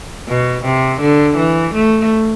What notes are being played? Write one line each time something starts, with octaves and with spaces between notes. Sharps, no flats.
B2
C3
D3
E3
A3